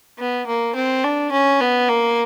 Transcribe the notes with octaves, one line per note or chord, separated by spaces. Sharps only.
B3
A#3
C4
D4
C#4
B3
A#3